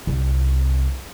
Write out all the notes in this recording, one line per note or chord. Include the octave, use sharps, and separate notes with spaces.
C2 C3